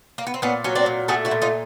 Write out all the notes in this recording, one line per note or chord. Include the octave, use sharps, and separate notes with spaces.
A#3
B3
C4
A#2 B3 C#4
F#3 C#4
C4 D4
A#2
A3 F#4 G#4
E4 F#4
A#2
D#4 F4